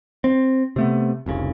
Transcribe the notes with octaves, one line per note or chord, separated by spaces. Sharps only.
C4
C3 A3 B3
F1 C2 C#3